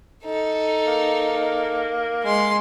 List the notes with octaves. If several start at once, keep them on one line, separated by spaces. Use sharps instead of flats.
D#4 A4
A#3
G#3 C6